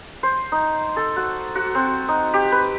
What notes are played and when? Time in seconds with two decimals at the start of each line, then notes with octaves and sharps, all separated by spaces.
0.23 C5
0.52 D#4
0.96 A4
1.16 F#4
1.55 F#4
1.75 C4
2.08 D#4
2.34 G4
2.52 B4